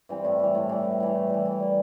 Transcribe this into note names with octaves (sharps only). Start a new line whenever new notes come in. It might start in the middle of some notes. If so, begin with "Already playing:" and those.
E3 G3 C4
A2
E3 G3
A2
E3 G3
A2
E3 G3
A2
E3 G3
E3
G3 A#3